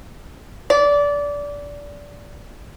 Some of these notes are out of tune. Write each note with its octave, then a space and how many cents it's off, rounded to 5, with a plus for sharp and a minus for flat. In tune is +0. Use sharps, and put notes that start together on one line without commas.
D5 -20